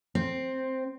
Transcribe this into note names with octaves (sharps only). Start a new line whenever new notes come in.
C4